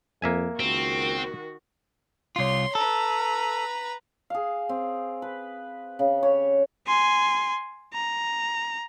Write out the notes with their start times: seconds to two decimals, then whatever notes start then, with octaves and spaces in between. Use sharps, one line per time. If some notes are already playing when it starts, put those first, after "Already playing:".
0.22 F2 A#3 E5 G#5
0.60 C#2 D#3 C4 F#4
2.36 C2 F4 C#5 C6
2.75 A4 B4 A#5
4.30 G#4 F5
4.69 C4
5.22 B4
5.99 C#3
6.23 G4 C#5
6.87 G#5 C6
7.94 A#5